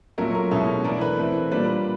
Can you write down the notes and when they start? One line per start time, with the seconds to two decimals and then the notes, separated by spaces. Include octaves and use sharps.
0.18 A#2 F#3 A3 C#4 A#4
0.35 A#4
0.51 B2 G#3 C#4 E4 A4
0.84 E3 A3 D4 A#4
1.01 B4
1.18 E3 A3 C4
1.51 A#2 G3 A#3 D4 B4